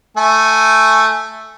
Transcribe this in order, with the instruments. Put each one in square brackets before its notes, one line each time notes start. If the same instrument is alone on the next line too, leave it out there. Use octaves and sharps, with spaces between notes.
[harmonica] A3 G#5